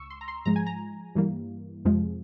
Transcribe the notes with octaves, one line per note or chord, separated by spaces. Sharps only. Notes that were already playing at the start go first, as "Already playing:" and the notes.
Already playing: C#2 C#6 E6
C6
A#5
C6
G#2 F3 G#3 A#5
G#5
A#5
G2 E3 G3 A#3
F2 C3 F3 G#3